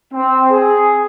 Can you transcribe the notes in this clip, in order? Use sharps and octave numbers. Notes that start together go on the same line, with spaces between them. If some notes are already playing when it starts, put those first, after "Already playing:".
C4
G#4